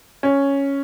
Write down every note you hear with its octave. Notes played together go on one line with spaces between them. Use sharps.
C#4